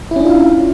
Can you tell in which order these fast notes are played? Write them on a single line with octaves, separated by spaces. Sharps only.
E4 C#4 D4 F4 F5